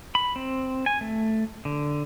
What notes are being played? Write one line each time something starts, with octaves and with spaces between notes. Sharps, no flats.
B5
C4
G#5
A3
D3